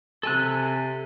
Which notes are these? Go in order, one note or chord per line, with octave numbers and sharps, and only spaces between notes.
C3 A4 G#5 F#6